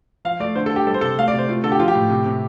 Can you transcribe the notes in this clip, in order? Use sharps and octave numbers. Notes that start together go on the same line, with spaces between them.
F3 F5
A3 D5
D3 C5
A4
D3
G4
G3 A4
C5
C3 A4
A3 F5
D5
C3
C5
A3 F4
D3 A4
G4
F3 F4
G4
A2
C3
C3